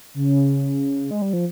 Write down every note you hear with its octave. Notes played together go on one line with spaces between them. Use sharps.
C#3
G#3
G3
F3